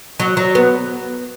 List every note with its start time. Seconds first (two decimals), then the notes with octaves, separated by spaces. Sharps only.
0.20 F#3
0.37 F#3
0.55 B3